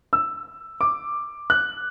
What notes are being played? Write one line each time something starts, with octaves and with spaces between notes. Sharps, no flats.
E6
D6
F#6